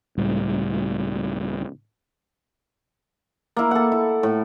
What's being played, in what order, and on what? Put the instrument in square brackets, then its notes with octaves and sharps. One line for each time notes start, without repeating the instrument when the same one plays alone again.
[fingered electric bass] C#2 A2 G3
[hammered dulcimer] A#3 E4
A4 F#5
E4
A2